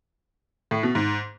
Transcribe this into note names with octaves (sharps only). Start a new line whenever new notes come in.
A2
B2
G#2